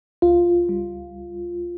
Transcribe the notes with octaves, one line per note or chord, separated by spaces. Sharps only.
C#2 F4
G3